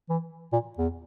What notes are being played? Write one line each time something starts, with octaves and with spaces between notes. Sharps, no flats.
E3
A#2
E2